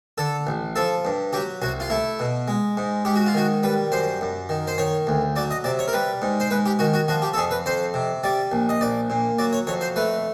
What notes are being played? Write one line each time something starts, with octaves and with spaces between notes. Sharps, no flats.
D3 A4
A1
F3 A4
G2
F#3 G4
C2 F#4
F4
A3 E4
B2
G#3
G#2
G#2 G4
F#4
F4
D#3 F#4
G3 B4
F#2 C5
F#2
D#3
C5
D#3 C#5
D2
F#3 D5
D#5
C3 D5
C#5
A#4
G3 B4
G#2
C5
G#2 B4
G4
D#3 F#4
F#4
F3 F#4
G4
A4
F2 G#4
B4
F2 C5
C3
G3 D5
A#1
D#5
A#1 D5
A#2
F#3 D5
C#5
F2 C#5
C5
A3 B4